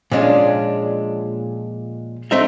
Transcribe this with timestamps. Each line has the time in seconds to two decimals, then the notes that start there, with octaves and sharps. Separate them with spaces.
0.12 A#2 F3 G#3 C#4 D4
2.31 A3 C4 D#4 E5